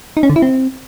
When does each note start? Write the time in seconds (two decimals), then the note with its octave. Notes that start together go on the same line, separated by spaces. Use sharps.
0.17 D#4
0.23 C#4
0.30 D3
0.36 E4
0.42 C4